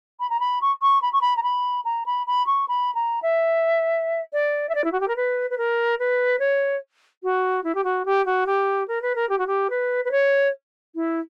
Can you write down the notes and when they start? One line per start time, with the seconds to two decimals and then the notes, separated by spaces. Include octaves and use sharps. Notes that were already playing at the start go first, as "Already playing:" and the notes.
0.20 B5
0.30 A#5
0.40 B5
0.61 C#6
0.82 C#6
1.02 B5
1.13 C#6
1.21 B5
1.37 A#5
1.43 B5
1.85 A#5
2.06 B5
2.27 B5
2.47 C#6
2.68 B5
2.95 A#5
3.22 E5
4.33 D5
4.69 E5
4.75 D5
4.84 E4
4.92 F#4
5.00 G4
5.08 A#4
5.16 B4
5.50 B4
5.58 A#4
5.99 B4
6.39 C#5
7.23 F#4
7.64 E4
7.75 G4
7.84 F#4
8.05 G4
8.26 F#4
8.46 G4
8.88 A#4
9.02 B4
9.15 A#4
9.29 G4
9.38 F#4
9.47 G4
9.70 B4
10.05 B4
10.11 C#5
10.95 E4